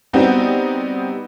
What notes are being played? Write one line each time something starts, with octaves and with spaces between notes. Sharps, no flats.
G3 B3 C4 D#4 F#4 G4